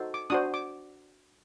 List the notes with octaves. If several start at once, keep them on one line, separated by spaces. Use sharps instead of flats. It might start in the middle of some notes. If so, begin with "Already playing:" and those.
Already playing: D#4 F#4 A4 C5
D6
D4 F#4 C5 D#6
D6